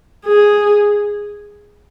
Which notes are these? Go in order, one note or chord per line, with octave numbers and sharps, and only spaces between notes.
G#4